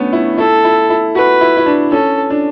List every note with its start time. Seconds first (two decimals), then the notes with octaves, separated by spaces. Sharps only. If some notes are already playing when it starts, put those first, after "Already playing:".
Already playing: A3 B3 C#4 D4
0.13 E4
0.38 E4 A4
0.64 E4
0.90 E4
1.15 F#4 B4
1.41 E4
1.57 E4
1.66 D4
1.92 C#4 A4
2.30 D4